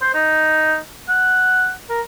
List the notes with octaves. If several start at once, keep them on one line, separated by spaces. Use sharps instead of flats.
C5
D#4
F#5
A#4